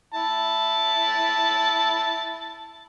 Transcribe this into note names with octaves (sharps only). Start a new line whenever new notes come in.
E4 A5